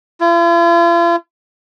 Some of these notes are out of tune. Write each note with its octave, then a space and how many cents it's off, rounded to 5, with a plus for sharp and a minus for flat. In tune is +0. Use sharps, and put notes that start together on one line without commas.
F4 -45